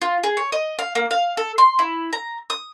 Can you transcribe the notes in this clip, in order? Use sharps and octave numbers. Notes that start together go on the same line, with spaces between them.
F4
G#4
C#5
D#5
F5
A#3
F5
A4
C6
E4
A#5
D#6